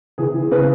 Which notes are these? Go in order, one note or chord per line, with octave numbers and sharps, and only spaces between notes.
E3 G#4
E3
C#3 B4